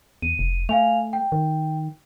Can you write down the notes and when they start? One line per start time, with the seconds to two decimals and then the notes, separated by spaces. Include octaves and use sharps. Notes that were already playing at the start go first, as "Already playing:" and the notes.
0.22 E2 D#7
0.39 F1
0.69 A3 F5 G#5 F7
1.13 G5
1.32 D#3